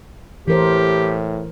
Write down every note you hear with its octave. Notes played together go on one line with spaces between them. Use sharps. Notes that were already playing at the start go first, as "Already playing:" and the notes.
A2 E3 G4 A#4 C5